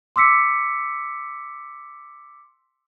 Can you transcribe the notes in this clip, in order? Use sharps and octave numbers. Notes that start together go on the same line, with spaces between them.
C6 D6 E6 B6 C#7